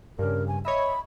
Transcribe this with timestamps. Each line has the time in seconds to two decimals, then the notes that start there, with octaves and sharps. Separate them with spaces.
0.19 G2 C#3 A#4
0.48 G#5
0.65 C#5 D#5 E5 B5